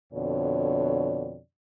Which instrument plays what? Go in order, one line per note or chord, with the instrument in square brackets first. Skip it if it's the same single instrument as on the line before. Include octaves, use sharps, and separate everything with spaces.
[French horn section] F2 B2 D3 C#5 D5